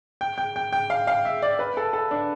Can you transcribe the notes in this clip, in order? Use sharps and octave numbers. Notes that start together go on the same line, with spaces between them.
G5
G5
G5
G5
F5
F5
E5
D5
B4
A4
A4
D4